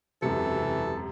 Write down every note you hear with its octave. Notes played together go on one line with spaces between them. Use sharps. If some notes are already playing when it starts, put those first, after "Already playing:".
E1 F#2 C3 E3 A4 C#7